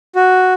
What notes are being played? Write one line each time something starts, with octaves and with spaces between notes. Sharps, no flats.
F#4